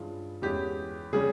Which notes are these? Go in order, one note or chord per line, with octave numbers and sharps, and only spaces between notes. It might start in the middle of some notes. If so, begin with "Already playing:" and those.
Already playing: G2 E3 G#3 C#4 F4
E2 E3 G#3 C#4 G4
C#3 G3 C#4 G#4